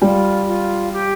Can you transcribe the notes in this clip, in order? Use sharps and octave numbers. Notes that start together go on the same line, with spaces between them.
G3 F4
F4
G4